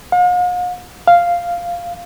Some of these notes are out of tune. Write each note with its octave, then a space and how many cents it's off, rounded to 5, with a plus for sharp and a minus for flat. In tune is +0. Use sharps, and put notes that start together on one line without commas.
F5 +45
F5 -5